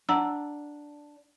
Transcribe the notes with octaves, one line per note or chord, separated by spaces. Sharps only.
D4 F#5 A#5 E6